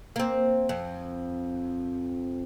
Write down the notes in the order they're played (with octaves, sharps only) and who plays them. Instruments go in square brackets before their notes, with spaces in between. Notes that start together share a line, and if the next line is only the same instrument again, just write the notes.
[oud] A#3 C4
F2